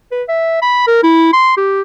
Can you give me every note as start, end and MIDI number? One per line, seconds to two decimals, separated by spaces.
0.12 0.23 71
0.28 0.61 76
0.62 0.82 83
0.87 0.98 70
1.03 1.30 64
1.33 1.56 84
1.57 1.81 67